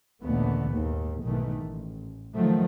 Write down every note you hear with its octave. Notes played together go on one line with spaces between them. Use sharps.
A#1 D#2 D3 E3 A3 B3
D#2 G#2
B1 G#2 D#3 E3 A3
A1
D#3 F3 F#3 A3